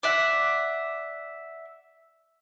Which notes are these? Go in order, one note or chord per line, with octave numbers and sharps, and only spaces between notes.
D5 E5 F#5